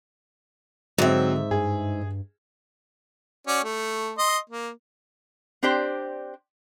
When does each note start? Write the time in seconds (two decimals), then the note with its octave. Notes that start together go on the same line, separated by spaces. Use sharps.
0.98 G#2 D3 F#3 C4 E5
1.51 G2 G#4
3.47 C#4 F#4 D5
3.64 A3
4.18 D#5 C6
4.50 A#3
5.63 C4 D4 G4 C5 D5